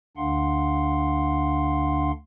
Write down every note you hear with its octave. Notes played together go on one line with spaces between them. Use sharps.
D2 D3 D4 F5 F#5 C6